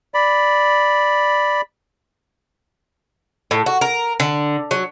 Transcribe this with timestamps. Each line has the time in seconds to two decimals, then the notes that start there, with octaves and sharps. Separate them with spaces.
0.14 D5 B5
3.51 A2
3.66 F#4
3.81 A#4
4.20 D3
4.71 F#3